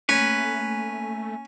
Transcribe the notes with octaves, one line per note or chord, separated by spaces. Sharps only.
A3 A#3 C#4 B4 G#5